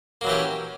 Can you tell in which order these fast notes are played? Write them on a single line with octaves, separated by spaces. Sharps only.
A#3 F#3 E3 G4 C#4